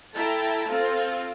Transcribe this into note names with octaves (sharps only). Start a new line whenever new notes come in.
E4 A4 G5 A5 A#5
C4 F4 A4